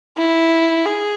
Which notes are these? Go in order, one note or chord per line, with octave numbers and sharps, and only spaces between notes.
E4
G#4